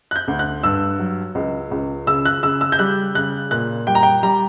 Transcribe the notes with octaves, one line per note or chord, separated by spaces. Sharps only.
F#6
G6
D2
F#6
G2 E6
F#3
C#2
C#2
C#3 E6
F#6
C#3 E6
E6
G6
G3 F#6
C#3 F#6
A#2 F#6
G3 G5
A#5
G5
G3 A#5